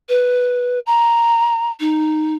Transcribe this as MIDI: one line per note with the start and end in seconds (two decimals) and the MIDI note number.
0.09 0.79 71
0.86 1.69 82
1.80 2.34 63